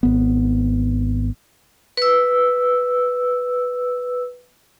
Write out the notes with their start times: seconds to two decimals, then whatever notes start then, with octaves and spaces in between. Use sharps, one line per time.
0.03 G#1 B3
1.97 B4 E6